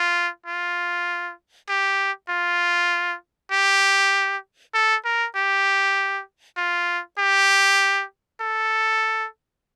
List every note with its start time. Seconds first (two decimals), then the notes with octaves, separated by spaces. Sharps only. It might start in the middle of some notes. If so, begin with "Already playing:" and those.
Already playing: F4
0.46 F4
1.69 G4
2.29 F4
3.51 G4
4.74 A4
5.05 A#4
5.36 G4
6.57 F4
7.18 G4
8.41 A4